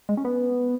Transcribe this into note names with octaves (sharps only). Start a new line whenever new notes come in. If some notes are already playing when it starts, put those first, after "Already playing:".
G#3
C#4
B3